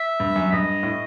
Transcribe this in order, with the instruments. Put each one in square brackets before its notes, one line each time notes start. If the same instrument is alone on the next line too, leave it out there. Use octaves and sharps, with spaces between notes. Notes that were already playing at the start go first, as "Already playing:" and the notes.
Already playing: [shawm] E5
[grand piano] G2
F#2
[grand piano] G2 [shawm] D#5
[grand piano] A2